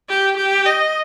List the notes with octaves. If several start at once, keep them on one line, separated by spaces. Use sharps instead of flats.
G4
G4
D#5